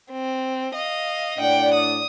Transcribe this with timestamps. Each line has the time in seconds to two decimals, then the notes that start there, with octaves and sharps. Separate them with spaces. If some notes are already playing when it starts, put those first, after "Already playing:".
0.12 C4
0.74 D#5 F5
1.39 A2 D4 D5 F#5 G5
1.74 D#6